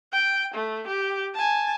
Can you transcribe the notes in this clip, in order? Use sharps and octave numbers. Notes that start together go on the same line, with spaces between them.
G5
A3
G4
G#5 A5